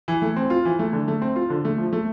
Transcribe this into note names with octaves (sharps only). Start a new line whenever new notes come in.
E3
A3
C4
F4
E3
A3
D3
A3
C4
F4
D3
A3
F3
A3